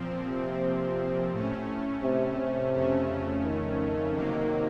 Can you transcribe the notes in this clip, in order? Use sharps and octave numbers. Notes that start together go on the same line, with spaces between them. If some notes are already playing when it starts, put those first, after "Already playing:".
Already playing: A#2 F3 C4
C3
A2 A3 C#4
C3
C3
F2 C#3 A3 C#4
D#3
C3 F#3 A#3